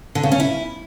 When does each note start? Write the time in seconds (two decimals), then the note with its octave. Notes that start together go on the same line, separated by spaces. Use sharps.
0.15 D3
0.23 C#3
0.32 C#4
0.40 E4